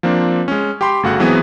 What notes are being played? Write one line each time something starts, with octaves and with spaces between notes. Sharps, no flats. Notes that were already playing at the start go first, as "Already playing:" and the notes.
F3 A#3 C4 D4
G#3 C#4
G4 G5 B5 C6
G1 C#3 A3 F#4 F5 F#5
E3 F#3 G#3 B3 C4 G#4